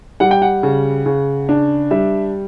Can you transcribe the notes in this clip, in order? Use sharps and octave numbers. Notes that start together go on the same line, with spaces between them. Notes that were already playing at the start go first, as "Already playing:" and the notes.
G3 F#5
G5
F#5
C#3
C#3
D4
G3 E5